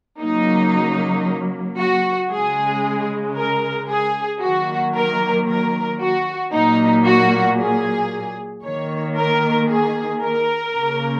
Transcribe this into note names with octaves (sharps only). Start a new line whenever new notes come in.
C#3 F#3 A#3 D#4
F#4
C#3 G#3 G#4
A#4
G#4
D#3 F#3 A#3 F#4
A#4
A#4
F#4
A#2 F#3 A#3 D#4
F#4
G#4
D#3 A#3 C#5
A#4
G#4
A#4
C#3 A#3